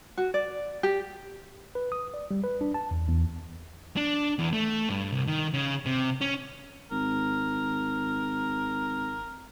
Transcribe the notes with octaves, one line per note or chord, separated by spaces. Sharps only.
F#4
D5
G4
B4
D#6
D5
G3
B4
D4
A5
E2
E2
D4
E2
A3
G2
C2
D#3
C#3
C3
C#4
G#1 A#4